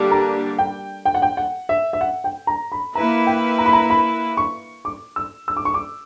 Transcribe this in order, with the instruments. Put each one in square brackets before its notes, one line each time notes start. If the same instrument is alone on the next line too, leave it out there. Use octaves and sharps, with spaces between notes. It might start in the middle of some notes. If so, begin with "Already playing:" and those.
Already playing: [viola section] D3 G3 A#3 D4 G4
[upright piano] A#5
G5
G5
F#5
G5
F#5
E5
E5
F#5
G5
A#5
B5
[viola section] A#3 E4 B4 [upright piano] A#5
[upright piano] G5
A#5
B5
A#5
B5
C#6
D6
E6
E6
D6
C#6
D6